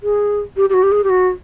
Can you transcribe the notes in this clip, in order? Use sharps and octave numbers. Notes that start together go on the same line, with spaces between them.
G#4
G4
G4
F#4
G4
G#4
G4
F#4